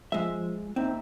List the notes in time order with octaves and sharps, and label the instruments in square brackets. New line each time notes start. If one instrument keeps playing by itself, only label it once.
[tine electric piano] F3 [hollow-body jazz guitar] G#3 E5
[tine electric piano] A#3 D#4 E5 [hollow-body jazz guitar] C4